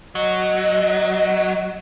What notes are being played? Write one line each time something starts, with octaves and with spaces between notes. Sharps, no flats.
F#3 D#5